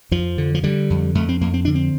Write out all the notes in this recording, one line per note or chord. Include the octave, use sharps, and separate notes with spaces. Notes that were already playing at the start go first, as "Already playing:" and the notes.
F2 F3
D3
F3
D3 G3
F2
F2 A3
C4
F2 A#3
C4
D3 D4
C4